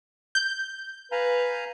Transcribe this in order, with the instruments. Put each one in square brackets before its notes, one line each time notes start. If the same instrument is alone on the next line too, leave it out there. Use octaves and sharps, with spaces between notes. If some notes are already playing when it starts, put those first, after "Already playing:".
[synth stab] G6
[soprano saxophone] B4 [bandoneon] F5 G#5 A#5